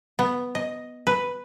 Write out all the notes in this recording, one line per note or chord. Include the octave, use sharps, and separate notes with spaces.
B3
D#5
B4